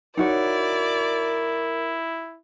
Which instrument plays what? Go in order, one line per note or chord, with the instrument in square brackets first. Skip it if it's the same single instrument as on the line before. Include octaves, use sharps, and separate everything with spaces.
[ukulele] D#4 F#4 C#5 [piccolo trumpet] E4 [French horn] A#4 [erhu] D5